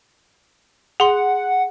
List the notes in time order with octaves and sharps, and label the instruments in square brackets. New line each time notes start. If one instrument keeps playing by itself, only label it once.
[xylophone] G#4 C6 [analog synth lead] F#5